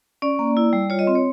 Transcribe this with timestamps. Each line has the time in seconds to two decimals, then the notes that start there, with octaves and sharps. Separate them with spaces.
0.22 C#4 D5
0.39 A#3
0.57 E4
0.73 G3
0.90 F4 C#5
0.99 D#5
1.07 C4
1.15 C#5